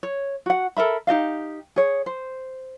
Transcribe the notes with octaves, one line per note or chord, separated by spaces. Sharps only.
C#5
F#4 F#5
A4 A#4 E5 B5
D#4 G4 D#5 F5
G#4 C#5
C5